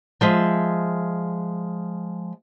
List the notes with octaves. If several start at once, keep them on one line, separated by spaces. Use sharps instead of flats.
F3 G#3 E5